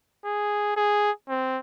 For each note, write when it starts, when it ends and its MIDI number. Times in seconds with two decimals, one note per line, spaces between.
0.25 0.74 68
0.77 1.11 68
1.29 1.59 60